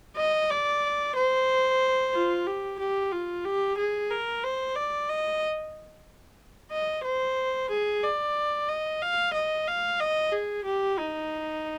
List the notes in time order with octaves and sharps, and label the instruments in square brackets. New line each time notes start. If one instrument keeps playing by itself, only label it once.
[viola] D#5
D5
C5
F4
G4
G4
F4
G4
G#4
A#4
C5
D5
D#5
D#5
C5
G#4
D5
D#5
F5
D#5
F5
D#5
G#4
G4
D#4